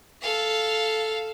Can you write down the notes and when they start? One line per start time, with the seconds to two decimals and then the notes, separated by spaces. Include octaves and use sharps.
0.22 A4 F5